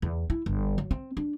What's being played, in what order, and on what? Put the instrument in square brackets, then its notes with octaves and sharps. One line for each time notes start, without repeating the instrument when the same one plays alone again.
[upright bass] E2
E4
G1
F#3
C4
D4